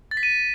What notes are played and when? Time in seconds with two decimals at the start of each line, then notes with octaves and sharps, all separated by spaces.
0.11 A6
0.17 B6
0.23 D#7